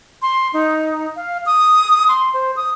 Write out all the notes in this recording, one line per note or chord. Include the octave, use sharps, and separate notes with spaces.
C6
D#4
F5
D#6
C6
C5
D#6